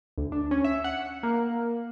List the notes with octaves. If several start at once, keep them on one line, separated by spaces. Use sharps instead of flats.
D2
D4
C#4
E5
F#5
A#3